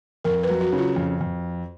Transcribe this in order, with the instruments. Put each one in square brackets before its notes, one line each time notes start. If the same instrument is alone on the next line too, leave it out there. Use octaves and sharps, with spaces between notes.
[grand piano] F2 [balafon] A#4
[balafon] B4
[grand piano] F#3
[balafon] F#4
[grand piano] C#3
[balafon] F4
[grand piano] F2
F2